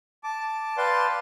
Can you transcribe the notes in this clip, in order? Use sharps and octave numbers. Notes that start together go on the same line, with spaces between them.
A5 D6
B4 D5 F5 G5 A5 C6